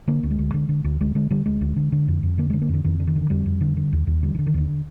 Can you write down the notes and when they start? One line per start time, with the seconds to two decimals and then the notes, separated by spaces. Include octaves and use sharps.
0.08 D3 A#3
0.23 D2
0.31 G#3
0.39 D2
0.54 D3
0.69 D3
0.84 D2
1.01 D2 G#3
1.15 D3 G#3
1.31 D3 G3
1.46 D2 G#3
1.61 D2
1.76 D3
1.92 D3
2.08 F2
2.23 F2
2.38 D3 A#3
2.50 D3 G#3
2.62 A#3
2.69 F2 D3
2.84 F2 D#3
3.00 D3
3.07 D#3
3.16 D3
3.30 F2 G3
3.46 F2
3.61 D3
3.77 D3
3.93 D#2
4.07 D#2
4.23 D3 G3
4.35 D#3
4.39 D3
4.47 D#3
4.54 D#2 D3